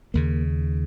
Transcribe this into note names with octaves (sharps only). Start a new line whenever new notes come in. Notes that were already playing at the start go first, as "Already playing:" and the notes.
D#2 C#3 A#3